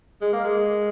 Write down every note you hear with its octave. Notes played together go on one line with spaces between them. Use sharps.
G#3
A#3
G#3